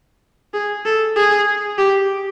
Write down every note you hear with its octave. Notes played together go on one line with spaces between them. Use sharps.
G#4
A4
G#4
G4